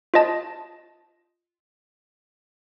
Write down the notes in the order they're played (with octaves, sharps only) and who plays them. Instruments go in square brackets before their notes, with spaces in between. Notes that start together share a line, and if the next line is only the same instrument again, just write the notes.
[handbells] F4 C5 D#5 A5